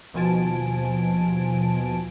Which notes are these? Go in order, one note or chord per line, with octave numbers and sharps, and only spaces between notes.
D#2 B2 F3 G#5 A5 D7